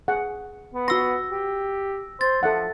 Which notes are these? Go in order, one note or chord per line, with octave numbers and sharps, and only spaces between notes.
G#4 F#5
B3
F#4 C6 E6 A#6
G4
C5 A6
F3 A4 E5 F#5